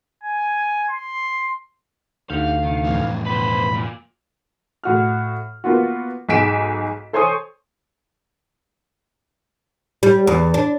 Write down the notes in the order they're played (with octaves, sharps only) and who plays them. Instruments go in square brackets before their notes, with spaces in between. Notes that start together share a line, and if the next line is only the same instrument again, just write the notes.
[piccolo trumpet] G#5
C6
[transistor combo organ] D2 [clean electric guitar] D#4 G4 F#5 [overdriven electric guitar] F5
[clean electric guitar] C3 D#3
[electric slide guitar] F2 A2 E3
[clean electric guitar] B2 [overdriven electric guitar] B4 C5 [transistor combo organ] B5
[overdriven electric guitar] A#2
[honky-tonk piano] A2 F#4 F6
A#3 B3 F4 F#4
B1 G#2 G#5 B6 D7 E7
A4 C5 C#5 G#5 C#6 D#6
[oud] G3
E2
D4